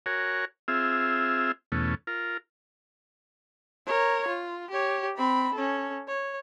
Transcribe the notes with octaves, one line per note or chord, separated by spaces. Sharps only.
F#4 A#4 C#5 G#5
C4 F4 G#4 E5
E2 B2 A3 C#4
F4 A#4
A#4 C#5
F4
G4 C#5
C4 B5
C#4 A4
C#5